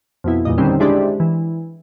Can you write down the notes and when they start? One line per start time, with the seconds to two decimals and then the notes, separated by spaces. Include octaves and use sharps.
0.24 F2 B2 E4
0.45 E2 G2 A#2 D#5
0.58 D3 D#3 G3 C4 C#4
0.80 G#3 D4 E4 G4 C5 D5
1.20 E3